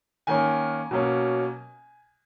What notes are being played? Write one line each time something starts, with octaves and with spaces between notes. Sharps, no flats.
D#3 A#3 C#4 G#5
B2 F#3 A#3 C#4